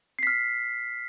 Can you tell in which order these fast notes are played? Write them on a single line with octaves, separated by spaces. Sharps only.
C7 B6 F6